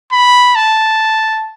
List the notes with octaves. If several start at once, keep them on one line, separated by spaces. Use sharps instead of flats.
B5
A5